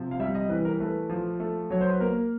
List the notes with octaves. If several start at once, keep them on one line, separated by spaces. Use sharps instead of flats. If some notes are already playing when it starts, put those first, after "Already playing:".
Already playing: C3 F3
F5
G3 E5
D#5
E3 B4
A#4
A3 B4
F3
A3
F#3 C#5
C5
B4
A#3 A#4